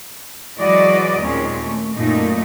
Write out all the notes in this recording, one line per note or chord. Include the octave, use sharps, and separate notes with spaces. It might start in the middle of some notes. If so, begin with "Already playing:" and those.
E3 F#3 G#3 F#4 D5 D#5
D#2 A#2 G#3 C4 C#4
A3
F#2 A#2 A3 D#4